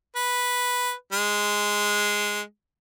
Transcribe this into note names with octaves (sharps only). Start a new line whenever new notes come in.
B4
G#3